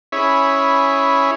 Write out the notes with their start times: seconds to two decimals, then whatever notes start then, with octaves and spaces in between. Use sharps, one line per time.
0.12 C#4 E4 G#4 C#5 E5 B5